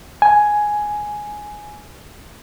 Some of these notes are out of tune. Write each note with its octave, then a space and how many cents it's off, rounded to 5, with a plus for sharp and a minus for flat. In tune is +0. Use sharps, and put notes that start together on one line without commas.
G#5 +5